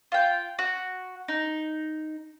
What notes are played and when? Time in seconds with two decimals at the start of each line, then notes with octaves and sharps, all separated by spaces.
0.12 F4 G5
0.59 F#4
1.28 D#4